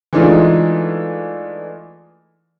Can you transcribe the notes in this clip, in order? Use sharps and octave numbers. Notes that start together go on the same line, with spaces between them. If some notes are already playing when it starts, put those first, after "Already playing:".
E3 G#3 A3 D4 D#4 F4